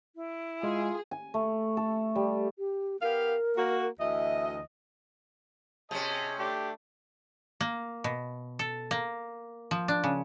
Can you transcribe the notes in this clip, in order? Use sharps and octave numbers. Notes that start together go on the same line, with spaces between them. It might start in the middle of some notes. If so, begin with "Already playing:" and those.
E4
G#3 F4 G#4
G#5
A3
A4
G3
G4
B3 G4 A#4 F5
A#3 F#4
D2 E3 D#5 E5
C3 C#4 G#4 D#5 A5 D#6
A3 D4 G4
A#3
B2
A4
A#3
F3
D4
C#3